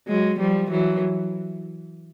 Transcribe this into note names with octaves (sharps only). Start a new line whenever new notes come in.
F#3 G#3
F3 G3
E3 F#3